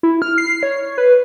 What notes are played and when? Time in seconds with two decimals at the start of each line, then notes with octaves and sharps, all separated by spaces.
0.03 E4
0.22 F6
0.38 C7
0.63 C#5
0.98 B4